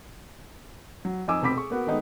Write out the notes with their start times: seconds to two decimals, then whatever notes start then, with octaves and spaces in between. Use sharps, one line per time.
1.05 F#3
1.28 F2 D#4 D#5 G#5 D6 E6
1.42 F1 B2 C4 B5 D6 B6
1.56 G#4 C#6
1.70 A#3 B3 F#4
1.87 D#3 G#3 A3 B3 D#4